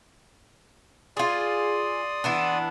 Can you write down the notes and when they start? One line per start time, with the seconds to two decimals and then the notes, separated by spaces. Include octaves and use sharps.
1.17 F4 G#4 D5 C6 D#6
2.24 E3 B3 D4